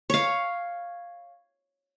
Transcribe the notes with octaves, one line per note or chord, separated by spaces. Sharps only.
C#5 F5